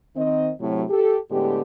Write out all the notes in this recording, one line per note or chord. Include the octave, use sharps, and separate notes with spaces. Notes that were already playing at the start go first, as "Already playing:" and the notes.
D#3 C4 D#5
A2 C3 F#3
G4 A4
A2 D3 G#3 B3 G4